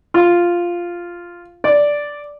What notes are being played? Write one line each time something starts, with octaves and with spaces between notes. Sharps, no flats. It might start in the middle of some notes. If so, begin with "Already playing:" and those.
F4
D5